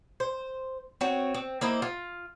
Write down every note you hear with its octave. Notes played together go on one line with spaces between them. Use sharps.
C5
C4 F#4 C#5
C4
A#3 C4 E4 D#5
F4